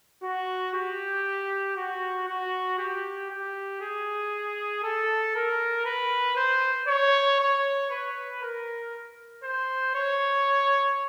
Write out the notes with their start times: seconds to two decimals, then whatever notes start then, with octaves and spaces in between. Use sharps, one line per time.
0.23 F#4
0.75 G4
1.77 F#4
2.28 F#4
2.78 G4
3.30 G4
3.81 G#4
4.83 A4
5.35 A#4
5.86 B4
6.36 C5
6.88 C#5
7.40 C#5
7.90 B4
8.42 A#4
9.44 C5
9.95 C#5